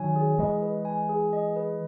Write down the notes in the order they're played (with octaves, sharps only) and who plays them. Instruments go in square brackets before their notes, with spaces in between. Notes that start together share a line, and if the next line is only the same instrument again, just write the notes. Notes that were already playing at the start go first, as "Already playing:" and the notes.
Already playing: [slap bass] D#3 F#3 [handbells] G#5
[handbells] G#4
[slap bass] E3 G#3 [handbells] D#5
[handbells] B4
G#5
G#4
D#5
B4